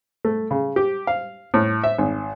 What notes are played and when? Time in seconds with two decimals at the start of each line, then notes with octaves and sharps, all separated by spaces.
0.25 A3
0.51 C#3
0.76 G4
1.07 F5
1.54 A2
1.84 E5
1.98 G#1